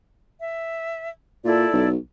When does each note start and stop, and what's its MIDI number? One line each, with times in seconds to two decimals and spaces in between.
0.40 1.09 76
1.45 1.67 46
1.45 1.88 64
1.45 1.88 69
1.45 1.88 74
1.74 1.96 35